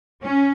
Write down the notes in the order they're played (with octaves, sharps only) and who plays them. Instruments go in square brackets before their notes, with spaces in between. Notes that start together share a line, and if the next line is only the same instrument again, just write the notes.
[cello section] C#4